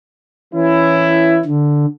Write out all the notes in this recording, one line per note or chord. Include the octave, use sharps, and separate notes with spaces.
E3 C#4 E4
D3